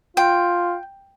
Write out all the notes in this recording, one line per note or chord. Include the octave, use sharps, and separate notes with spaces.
F4 G5